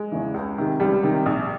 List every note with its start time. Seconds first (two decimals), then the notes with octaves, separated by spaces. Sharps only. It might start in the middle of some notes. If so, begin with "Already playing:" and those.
Already playing: G#3
0.12 E2 C#3 E3
0.34 C#2
0.58 C3 D#3
0.80 C#2 G3
1.03 C3 D#3
1.26 A#1